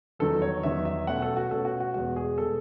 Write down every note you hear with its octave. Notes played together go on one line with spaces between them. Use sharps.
E2 D#3 F#3 A4
C#5
E2 D#3 F#3 E5
E5
B2 A3 C#4 F#5
A4
F#4
B2 A3 C#4 A4
F#4
F#4
E2 B2 G#3 F#4
G#4
B2 G#3 A4